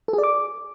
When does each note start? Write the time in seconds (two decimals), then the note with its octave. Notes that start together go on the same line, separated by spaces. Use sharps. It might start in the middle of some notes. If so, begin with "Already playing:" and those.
0.08 A4
0.13 G#4
0.18 D5
0.23 D6